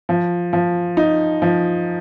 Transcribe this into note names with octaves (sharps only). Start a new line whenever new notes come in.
F3
F3
D#4
F3